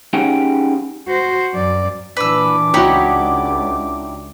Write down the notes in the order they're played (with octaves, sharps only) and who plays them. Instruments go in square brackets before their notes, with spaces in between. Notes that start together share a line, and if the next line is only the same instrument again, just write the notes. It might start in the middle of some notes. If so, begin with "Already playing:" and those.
[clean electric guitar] C#4 D#4 G4 G#4 F#5 G5
[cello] F#4 C5
F#2 D5
[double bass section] A#2 E3 [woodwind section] D4 D6 [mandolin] B4 E6
[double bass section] C#2 [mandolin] D#4 E4 G4 [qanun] F#4 C#5